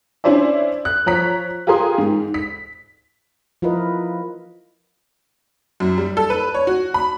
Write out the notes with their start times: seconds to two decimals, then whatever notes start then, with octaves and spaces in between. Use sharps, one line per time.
0.24 C#4 D4 E4 C5 D5 E5
0.85 F#6
1.06 F3 C#5 A#5 F#6 B6
1.67 F4 G4 G#4 A#4 C6 D#6
1.98 G#2
2.34 B6
3.62 F3 E4 F4 A#4 B4 D#5
5.80 F#2
5.98 G3
6.17 A4
6.30 B4
6.54 C#5
6.67 F#4
6.94 B5